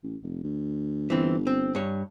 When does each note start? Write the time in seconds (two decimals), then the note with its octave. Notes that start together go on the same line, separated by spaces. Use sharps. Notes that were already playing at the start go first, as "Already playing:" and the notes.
0.03 A1
0.22 F1
0.43 D2
1.10 G1 E3 C4
1.47 C4
1.75 G2 C#5